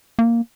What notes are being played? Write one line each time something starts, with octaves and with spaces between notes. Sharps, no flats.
A#3